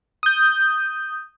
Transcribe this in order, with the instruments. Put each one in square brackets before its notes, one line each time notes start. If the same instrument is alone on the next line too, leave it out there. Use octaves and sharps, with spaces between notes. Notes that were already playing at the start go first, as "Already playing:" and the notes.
[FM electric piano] D#6 G6